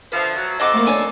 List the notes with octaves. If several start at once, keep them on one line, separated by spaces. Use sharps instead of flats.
D3 F3 B4 E5
F#3
F2 C4 A4 D#5 F#5 D6
A3 A#3
D4 C#5 G#5